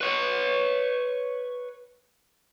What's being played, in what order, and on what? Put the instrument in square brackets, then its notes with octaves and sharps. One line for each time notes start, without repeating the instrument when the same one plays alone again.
[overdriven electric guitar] B4 C#5